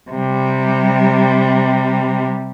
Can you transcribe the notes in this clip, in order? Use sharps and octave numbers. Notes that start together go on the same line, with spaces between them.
C3 G3